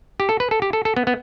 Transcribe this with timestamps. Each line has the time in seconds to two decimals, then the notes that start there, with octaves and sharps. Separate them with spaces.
0.20 G4
0.29 A4
0.40 B4
0.51 A4
0.62 G4
0.73 A4
0.85 A4
0.96 B3
1.07 B3